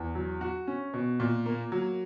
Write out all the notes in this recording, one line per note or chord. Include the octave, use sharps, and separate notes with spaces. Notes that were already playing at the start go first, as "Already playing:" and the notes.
Already playing: E2
F#3
F#4
C#4
B2
A#2
A#3
F#3